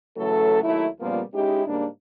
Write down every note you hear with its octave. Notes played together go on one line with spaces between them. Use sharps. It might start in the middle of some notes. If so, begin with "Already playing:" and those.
C#3 E3 F#3 A3 A4
D#2 F#3 A3 E4
A#2 C#3 F3 G3 A#3 B3
G#3 C#4 D#4 E4 G4
G#2 C#3 G3 A#3 D4